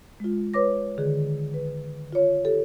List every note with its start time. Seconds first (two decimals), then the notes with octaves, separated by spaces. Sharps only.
0.20 G#3 F4
0.54 B4 C#5 D6 A#6
0.98 D3 D#3 G#4
1.54 B4
2.13 F4 C#5
2.45 G4 A4